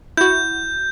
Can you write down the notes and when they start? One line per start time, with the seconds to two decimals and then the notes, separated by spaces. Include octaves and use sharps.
0.17 E4 F#4 G6